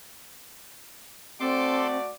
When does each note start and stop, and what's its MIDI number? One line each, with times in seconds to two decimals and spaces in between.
1.40 2.11 57
1.40 1.98 60
1.40 2.11 66
1.40 1.87 69
1.40 2.11 74
1.40 1.87 84
1.40 1.87 86